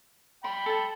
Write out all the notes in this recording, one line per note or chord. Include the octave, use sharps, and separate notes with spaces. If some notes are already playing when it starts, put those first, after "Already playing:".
G5 B5 C6
A4 A5